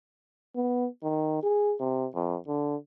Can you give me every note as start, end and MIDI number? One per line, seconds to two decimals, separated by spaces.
0.56 0.87 59
1.03 1.40 51
1.42 1.75 68
1.80 2.07 48
2.15 2.37 41
2.47 2.76 50